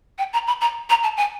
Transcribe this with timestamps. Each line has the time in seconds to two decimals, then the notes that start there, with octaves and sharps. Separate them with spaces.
0.18 G5
0.33 A#5
0.47 B5
0.61 A#5
0.89 A#5
1.03 A5
1.17 G#5